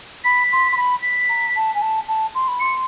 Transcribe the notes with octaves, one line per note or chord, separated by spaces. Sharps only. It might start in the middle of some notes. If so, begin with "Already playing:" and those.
B5 B6
C6
C6
B5
B6
A#5
A5
G#5
A5
A5
C6
B5
C6 C#7